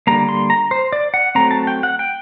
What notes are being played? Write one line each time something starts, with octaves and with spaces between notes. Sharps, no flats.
D3 G3 A#3 A#5
C6
A#5
C5
D5
F#5
F#3 A3 C4 A#5
A5
G5
F#5
G5